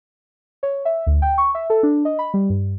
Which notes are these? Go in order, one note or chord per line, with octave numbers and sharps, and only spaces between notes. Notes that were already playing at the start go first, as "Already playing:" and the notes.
C#5
E5
D2
G5
C#6
E5
A4
D4
D#5
B5
G3
G2